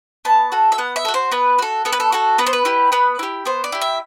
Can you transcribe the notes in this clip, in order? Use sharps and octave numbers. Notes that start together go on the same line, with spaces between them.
B3 A5
F#4 A4
E5
B3 F#5
E5
F#4 A4
C5
B3 B4
F#4 A4
B3 A4
B4
A4
F#4 A4
B3 B4
C5
B4
E4 G4
B3 B4
E4 G4
B3 C5
D5
E4 G4
E5